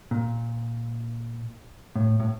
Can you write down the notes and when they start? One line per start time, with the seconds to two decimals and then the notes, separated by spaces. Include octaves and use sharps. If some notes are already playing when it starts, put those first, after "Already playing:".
0.11 A#2
1.96 A2
2.20 A2